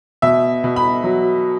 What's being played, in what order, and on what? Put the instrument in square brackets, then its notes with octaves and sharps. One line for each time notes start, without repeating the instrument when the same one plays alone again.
[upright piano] B2 E5
B2
B5
F#3